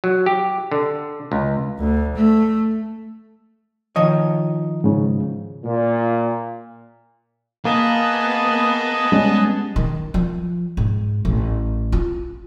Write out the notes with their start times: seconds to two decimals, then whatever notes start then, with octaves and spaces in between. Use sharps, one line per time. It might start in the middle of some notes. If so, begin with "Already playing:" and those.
0.04 F#3
0.26 G4
0.72 D3
1.32 C#2
1.78 D2
2.15 A3
3.96 D#3 F3 C#5 D#5
4.84 G#2 C#3
5.65 A#2
7.65 A#3 B3 G#4 B4 D#5 A5
9.12 G3 G#3 C#4
9.76 D#3
10.14 F3
10.77 G#2
11.25 A1
11.92 F4